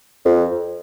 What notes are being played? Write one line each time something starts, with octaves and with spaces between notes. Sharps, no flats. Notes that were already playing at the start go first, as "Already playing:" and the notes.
F2